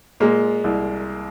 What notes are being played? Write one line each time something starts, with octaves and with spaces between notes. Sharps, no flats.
A#2 G#3 A#3
C2